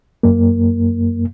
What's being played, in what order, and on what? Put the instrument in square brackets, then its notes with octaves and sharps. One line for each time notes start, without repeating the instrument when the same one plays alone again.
[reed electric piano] F#2 A#3